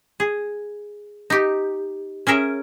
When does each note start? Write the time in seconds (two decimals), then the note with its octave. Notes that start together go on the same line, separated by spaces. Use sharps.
0.20 G#4
1.30 D#4 G4
2.27 C#4 G#4 A#4 E5